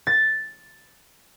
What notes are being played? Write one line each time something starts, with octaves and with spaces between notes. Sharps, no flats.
A6